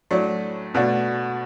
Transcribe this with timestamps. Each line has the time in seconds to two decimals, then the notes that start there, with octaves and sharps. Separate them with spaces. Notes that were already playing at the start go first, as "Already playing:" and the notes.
0.11 A2 F#3 A3 D4
0.74 B2 A3 D4 F#4